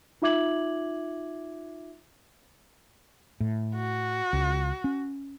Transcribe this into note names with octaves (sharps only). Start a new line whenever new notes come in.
D#4 F4 E5 D6 G#6 F#7
A2
F#4
C#2
C#4